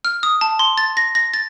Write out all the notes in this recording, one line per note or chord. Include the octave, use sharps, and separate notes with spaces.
F6
D#6
A5
C6
A6
A#6
A#6
A6